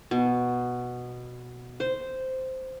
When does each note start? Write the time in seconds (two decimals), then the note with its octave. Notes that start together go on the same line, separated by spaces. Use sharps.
0.11 B2
1.80 C5